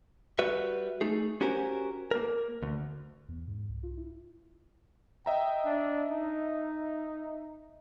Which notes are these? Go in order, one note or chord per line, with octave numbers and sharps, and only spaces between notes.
G3 F#4 B4 E5
A3 D#4 G#4
C#4 F#4 G4 A#4 C5 G#5
A#3 A#4
D2
E2
G#2
C2
F4
E4
D#5 E5 G5 A#5
D4
D#4